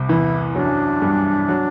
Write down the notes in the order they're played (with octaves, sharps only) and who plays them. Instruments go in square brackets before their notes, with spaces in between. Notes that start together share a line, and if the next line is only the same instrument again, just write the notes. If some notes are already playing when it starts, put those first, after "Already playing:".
Already playing: [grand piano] C2 C3
[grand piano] E2 E3 [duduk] E4
[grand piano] F#2 F#3 [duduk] D4
[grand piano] G2 G3
F#3